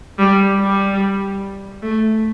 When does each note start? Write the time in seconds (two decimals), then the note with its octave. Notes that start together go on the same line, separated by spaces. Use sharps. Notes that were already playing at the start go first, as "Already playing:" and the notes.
0.19 G3
0.60 G3
1.82 A3